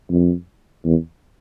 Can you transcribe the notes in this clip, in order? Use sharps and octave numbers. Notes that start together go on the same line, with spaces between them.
F2
E2